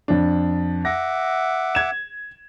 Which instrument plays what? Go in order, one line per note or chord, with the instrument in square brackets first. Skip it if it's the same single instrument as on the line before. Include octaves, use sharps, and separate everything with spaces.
[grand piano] F2 D4
[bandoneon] E5 F#5 D6 [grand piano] A#6
[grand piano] G#6 E7